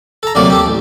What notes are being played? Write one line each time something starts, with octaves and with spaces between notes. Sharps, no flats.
A4 A#5
D2 C3 F#3 A#3 D5
G4 A4
A1